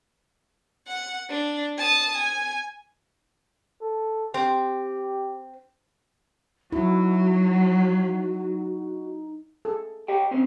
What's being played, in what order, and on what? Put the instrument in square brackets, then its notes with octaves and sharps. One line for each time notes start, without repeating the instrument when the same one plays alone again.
[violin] F#5
D4
A5 D#6
G#5
[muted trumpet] A4
[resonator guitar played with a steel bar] C4 [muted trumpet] G4
[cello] F#3 [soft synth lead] D#4 [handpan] E4 [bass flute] F#4
[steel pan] G#4 A4
[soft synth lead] G4 [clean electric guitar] C#5 D#5 G5
[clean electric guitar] D#3 C#4 C5 [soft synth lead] C4